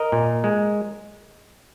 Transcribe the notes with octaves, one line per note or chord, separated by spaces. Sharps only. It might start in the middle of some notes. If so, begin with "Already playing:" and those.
Already playing: A#4 D#5
A#2
G#3